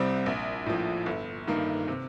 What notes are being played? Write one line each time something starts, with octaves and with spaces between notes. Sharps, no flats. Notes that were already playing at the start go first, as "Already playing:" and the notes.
Already playing: C2 C3 G3 C4
A#1
A2 F3
G1
G2 D#3 A#3
C3